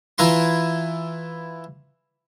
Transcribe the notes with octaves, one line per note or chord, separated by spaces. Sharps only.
E3 E4 F4 A#5 C6